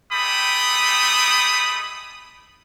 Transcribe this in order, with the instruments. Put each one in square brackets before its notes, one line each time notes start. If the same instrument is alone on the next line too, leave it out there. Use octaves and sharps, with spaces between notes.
[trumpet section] G#3 A3 G4 G5 B5 D#6